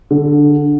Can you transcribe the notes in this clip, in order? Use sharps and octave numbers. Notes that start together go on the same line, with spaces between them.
D3